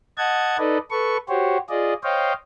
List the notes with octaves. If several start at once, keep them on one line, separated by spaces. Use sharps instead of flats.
D#5 F#5 A5 G#6
D#4 A4 B4 D5 D#5
A4 B4 C#6
F#4 G4 C5 C#5
F4 G#4 D5 D#5
C5 C#5 D#5 F5 G5